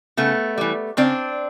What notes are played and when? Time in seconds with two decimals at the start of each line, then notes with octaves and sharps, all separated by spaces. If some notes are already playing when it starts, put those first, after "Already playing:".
0.17 C#3 A3 B3
0.58 E3 G3
0.97 C#3 C4 D4